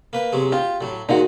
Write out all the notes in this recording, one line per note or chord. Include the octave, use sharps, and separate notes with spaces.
A#3 B4
C3 F#3 G#3
F4 G4
A2 F#3
A#2 D#3 G#3 D#4 F#4